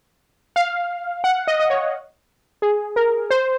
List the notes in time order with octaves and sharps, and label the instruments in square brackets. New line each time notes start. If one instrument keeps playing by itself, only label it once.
[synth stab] F5
F#5
D#5
D#5
C#5
G#4
A#4
C5